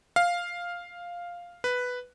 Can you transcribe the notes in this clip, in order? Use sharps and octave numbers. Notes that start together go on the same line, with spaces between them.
F5
B4